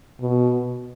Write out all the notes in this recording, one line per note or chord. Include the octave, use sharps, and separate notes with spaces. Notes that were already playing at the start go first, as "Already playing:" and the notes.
B2